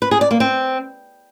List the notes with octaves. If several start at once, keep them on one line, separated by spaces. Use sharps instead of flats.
B4
G#4
D5
A#3
C4